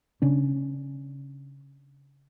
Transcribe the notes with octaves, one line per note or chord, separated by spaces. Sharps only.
C#3 C#4 D4